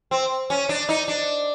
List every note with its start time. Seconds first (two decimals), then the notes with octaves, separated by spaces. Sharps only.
0.11 C4
0.50 C#4
0.69 D4
0.89 D#4
1.08 D4